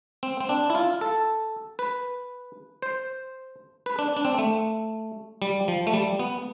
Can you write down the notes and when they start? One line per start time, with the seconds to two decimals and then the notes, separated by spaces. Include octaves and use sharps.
0.23 C4
0.41 C4
0.49 D4
0.70 E4
0.75 F4
1.01 A4
1.79 B4
2.82 C5
3.86 B4
3.99 D4
4.17 D4
4.25 C4
4.38 A3
5.42 G3
5.68 F3
5.87 A3
5.93 G3
6.19 B3